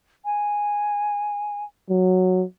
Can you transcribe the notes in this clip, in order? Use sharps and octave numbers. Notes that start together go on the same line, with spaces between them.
G#5
F#3